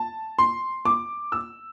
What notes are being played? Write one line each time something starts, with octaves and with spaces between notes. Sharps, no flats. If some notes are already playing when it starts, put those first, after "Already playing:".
Already playing: A5
C6
D6
E6